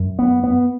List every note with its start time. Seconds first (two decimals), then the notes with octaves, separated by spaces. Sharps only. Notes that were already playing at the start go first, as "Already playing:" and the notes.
Already playing: F#2
0.19 B3
0.44 B3